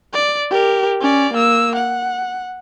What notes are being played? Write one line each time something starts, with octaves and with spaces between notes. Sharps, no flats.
D5
G4 A#4
C#4 D5
A#3 E6
F#5